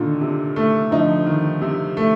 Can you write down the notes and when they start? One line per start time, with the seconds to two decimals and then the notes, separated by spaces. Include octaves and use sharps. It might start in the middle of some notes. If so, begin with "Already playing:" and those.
Already playing: A#2 D3 D#3
0.21 C3
0.56 A3
0.91 D3 F3 D#4
1.27 D#3
1.62 C3
1.97 A3